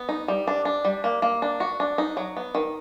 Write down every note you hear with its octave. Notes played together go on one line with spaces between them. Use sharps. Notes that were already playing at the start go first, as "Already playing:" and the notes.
Already playing: B3
D#4
G3
D4
D4
G3
A#3
A#3
D4
F#4
D4
D#4
F#3
B3
D#3